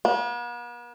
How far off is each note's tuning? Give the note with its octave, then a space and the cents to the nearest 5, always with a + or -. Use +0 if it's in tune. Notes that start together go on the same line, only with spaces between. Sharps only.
B3 -45